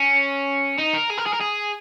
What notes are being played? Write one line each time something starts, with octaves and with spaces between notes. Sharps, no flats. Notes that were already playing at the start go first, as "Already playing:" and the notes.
Already playing: C#4
D#4
A#4
G#4
A#4
G#4
A#4
G#4